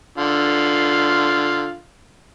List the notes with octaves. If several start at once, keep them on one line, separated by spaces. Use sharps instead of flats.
D3 F4